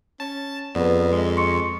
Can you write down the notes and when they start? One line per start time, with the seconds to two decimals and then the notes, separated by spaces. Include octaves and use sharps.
0.20 C#4 A5
0.75 F2 B3 G#4 B4 D5
1.12 G#3 D#5
1.37 C6 C#6 C#7